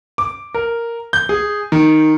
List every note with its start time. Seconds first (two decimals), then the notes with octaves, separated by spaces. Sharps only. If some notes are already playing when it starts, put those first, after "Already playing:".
0.18 D6
0.54 A#4
1.13 G6
1.29 G#4
1.72 D#3